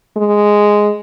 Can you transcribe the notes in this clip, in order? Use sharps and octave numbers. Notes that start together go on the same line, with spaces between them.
G#3